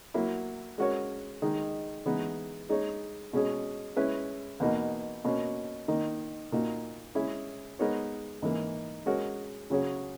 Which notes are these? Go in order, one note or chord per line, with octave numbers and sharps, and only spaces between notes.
F#3 A#3 E4
G#3 C#4 F#4 A#4 C#5
D#3 G#3 D#4
E3 G#3 B3 D#4
G#3 D#4 G#4 C#5
B2 G#3 C#4 G#4
G#3 C#4 E4 B4
E2 B2 A#3 D#4
B2 A#3 C#4
D#3 A#3 D#4
A#2 A#3 D#4 F#4
G#3 C#4 E4 G#4
G#3 B3 D#4 A#4 C#5
G#2 E3 A#3
G#3 C#4 F#4 A#4 C#5
C#3 F#3 C#4 G#4 C#5